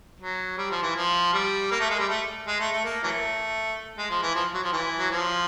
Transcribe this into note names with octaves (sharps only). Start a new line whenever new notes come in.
F#3
G3
F3
E3
F3
G3
A#3
A3
G#3
G3
A3
G#3
A3
A3
A#3
E3 F#3 A3
G#3
F3
E3
F3
F#3
F3
E3
F#3
F3